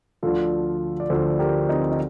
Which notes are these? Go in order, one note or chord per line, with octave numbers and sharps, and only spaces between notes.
D2 D3 F3 F4 A4
D5
D2 D3 F3 A4 C5
G4 A#4
C4 D#4
D#4